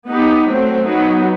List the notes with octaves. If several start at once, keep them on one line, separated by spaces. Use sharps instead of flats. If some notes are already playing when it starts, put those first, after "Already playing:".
B3 D#4 G4
F#3 A3 C4
F#3 B3 D#4